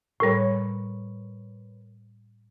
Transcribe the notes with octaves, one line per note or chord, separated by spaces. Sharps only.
A2 G3 A#4 B4 C#5